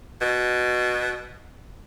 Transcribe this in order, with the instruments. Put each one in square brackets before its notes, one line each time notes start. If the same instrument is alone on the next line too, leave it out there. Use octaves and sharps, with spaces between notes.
[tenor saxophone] B2